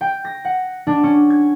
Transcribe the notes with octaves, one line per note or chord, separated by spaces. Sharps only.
G5
A#6
F#5
D4
C#4
G#6